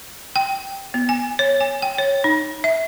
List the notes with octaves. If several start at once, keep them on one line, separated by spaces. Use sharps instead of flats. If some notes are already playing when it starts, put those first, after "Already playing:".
G5
B3
G#5
C#5
G#5
G5
C#5
D#4
E5